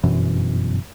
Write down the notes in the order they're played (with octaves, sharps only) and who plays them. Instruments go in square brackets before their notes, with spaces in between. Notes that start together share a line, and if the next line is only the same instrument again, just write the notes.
[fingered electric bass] G1 F#2 B2 E3